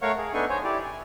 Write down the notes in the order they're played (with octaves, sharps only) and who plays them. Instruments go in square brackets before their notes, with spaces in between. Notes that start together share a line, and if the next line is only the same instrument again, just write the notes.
[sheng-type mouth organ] A3 A#4 C#5 F5 F#5 C#6
G#4
B3 D4 D#4 A4 G#5 C#6
C5 C#5 G#5
E4 G4 D5
G#5